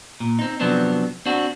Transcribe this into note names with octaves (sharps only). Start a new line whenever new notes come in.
A#2
C4 D#4
C3 F3 F#3 B3 C4 D4
C4 D4 F#4